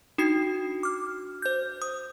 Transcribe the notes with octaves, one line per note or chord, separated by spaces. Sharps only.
D4 D#4 F#4 C7
D6 F6
C5 G6
D#6